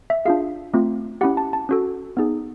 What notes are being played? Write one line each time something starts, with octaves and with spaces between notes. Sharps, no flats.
E5
D4 F4 G#4 F5
A3 C4 F4
C#4 E4 G4 F#5
A5
A5
C#4 F#4 A4
B3 D#4 G#4